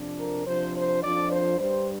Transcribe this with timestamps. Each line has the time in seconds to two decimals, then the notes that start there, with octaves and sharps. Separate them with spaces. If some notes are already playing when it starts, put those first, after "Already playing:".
Already playing: F2 C3 F3 D4
0.18 A#4
0.46 C3 F3 D4 C5
0.75 C5
1.02 F2 F3 D4 D5
1.31 C5
1.58 G2 G3 D4 C5